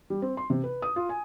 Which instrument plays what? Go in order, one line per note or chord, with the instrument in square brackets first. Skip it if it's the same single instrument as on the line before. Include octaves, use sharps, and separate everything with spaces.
[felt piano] G3
C4
C6
C3
B4
D#6
F4
G#5